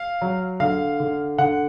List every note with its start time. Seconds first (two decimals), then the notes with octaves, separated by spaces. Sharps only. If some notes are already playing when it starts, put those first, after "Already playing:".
Already playing: F5
0.21 F#3
0.60 D3 F5
1.00 D3
1.38 D3 F#5